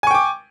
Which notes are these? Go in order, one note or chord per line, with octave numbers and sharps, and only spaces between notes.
G5 G#5 C#6 D6